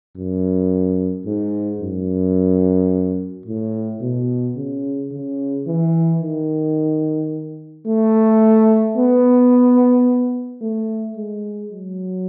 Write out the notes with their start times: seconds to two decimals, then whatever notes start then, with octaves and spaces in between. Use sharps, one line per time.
0.16 F#2
1.26 G#2
1.81 F#2
3.46 A2
4.01 B2
4.56 C#3
5.11 C#3
5.66 E3
6.21 D#3
7.86 A3
8.96 B3
10.62 A3
11.16 G#3
11.72 F#3